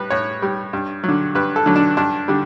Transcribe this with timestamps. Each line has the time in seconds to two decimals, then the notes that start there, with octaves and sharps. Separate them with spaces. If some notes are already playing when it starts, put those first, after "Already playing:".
Already playing: A2 G3 B4
0.11 A2 C#5
0.42 G3
0.73 G2
1.04 F#3
1.09 D3
1.35 G2 B4
1.56 A4
1.66 D3 F#3
1.76 D4
1.97 G2 D4
2.28 D3 G3